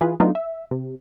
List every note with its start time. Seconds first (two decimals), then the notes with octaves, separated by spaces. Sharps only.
0.01 E3 F4 G#4 B4
0.20 F#3 A3 B3 D4 D#4 F4
0.35 E5
0.71 C3